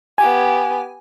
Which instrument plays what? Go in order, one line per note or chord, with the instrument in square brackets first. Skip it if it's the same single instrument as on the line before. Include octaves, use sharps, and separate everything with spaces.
[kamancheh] B3 G4 [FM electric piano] G#5